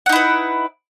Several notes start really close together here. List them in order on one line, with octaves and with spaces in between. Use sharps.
F#5 D#4 E4 B4